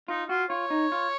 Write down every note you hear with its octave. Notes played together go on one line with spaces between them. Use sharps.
D#4 F4
F4 F#4
F4 C#5
D#4
F4